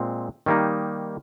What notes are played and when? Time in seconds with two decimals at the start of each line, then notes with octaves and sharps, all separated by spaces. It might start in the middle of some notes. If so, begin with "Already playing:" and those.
Already playing: A#2 G#3 C4
0.46 D#3 G3 A#3 D#4